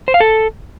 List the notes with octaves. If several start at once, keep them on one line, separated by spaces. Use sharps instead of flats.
C5
F5
A4